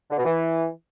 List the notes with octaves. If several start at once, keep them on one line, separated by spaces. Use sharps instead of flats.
D3
B2
E3